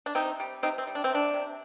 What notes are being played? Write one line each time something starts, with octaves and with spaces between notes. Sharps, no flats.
D4
C3 C4 D#4
G3
C3 C4 D#4
C4
G3
D4
C4
C3
D4
C3